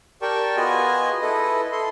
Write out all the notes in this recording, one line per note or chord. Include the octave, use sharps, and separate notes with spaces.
G4 A#4 D5 G5 A5 C#6
B3 F4 F#4 G#4 D#5 G#5
E4 A4 B4 D#5
A4 C6